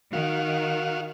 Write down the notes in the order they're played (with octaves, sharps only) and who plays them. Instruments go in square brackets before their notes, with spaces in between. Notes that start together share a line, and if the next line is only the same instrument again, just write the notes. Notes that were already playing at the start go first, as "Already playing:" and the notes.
[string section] D#3 [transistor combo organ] F#4 F5